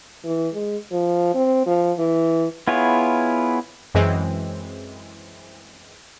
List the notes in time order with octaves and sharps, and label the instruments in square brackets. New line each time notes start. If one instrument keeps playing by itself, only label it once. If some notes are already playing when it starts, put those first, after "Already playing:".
[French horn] E3
G#3
F3
C4
F3
E3
[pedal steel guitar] B3 E4 F4 G#4 C#5
[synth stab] F#2 E3 G#3 C4